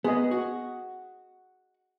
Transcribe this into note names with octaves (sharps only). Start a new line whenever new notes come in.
B3 G#4 D#5
F#4